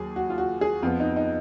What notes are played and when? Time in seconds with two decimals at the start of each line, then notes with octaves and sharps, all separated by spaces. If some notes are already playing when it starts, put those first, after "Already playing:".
Already playing: D#2 F#3 G#4
0.16 F#4
0.30 F4
0.38 F#4
0.61 G#4
0.82 F2 F3 B3 F4
1.00 D#4
1.16 D#4